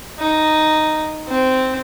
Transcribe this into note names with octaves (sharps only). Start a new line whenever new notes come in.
D#4
C4